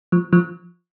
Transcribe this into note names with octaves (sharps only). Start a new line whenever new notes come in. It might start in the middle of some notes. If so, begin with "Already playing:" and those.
F3
F3